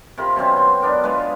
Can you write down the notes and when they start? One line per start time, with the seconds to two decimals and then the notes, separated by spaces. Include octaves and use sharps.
0.18 C3 F4 A#4 B5
0.36 B2 F#3 C4 C#4
0.57 C6
0.82 B3 D4 A#4
1.03 G#3 F4 B4